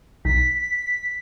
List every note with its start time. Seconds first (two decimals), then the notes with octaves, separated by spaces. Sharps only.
0.25 B1 D#4 B6